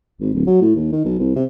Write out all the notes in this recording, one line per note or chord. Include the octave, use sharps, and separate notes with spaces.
G#1
D1
F#3
A2
D#2
D#3
B1
C2
C3